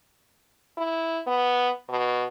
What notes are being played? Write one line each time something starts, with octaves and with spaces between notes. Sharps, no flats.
E4
B3
B2